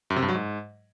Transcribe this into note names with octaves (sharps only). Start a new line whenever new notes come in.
F#2
C3
G2
F#3
G#2